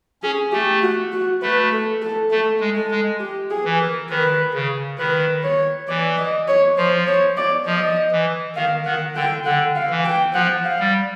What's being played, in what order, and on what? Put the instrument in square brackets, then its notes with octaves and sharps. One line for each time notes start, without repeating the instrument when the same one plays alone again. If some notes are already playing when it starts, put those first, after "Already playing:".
[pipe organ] C#4 [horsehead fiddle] G#4
[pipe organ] A3 [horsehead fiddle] G4
[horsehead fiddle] F#4
F#4
[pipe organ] A3 [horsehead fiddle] B4
[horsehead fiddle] A4
A4
[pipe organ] A3 [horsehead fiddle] A4
[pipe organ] G#3
[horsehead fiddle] A4
[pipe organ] G#3
[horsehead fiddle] G4
G#4
[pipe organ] E3
[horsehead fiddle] A#4
[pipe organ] D#3 [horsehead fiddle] B4
[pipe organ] C#3
[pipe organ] D#3 [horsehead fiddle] B4
[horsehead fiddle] C#5
[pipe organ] E3 [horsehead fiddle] D5
[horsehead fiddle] D#5
C#5
[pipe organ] F3 [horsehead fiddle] C5
[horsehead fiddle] C#5
D5
[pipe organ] F3 [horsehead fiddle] D#5
[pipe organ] E3
[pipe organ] D#3 [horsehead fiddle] F5
[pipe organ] D#3 [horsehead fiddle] F#5
[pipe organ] D3 [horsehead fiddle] G5
[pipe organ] D3 [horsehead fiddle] F#5
[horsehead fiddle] F5
[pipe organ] E3
[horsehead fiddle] G5
[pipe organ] F3 [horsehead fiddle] F#5
[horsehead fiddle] F5
[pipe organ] G3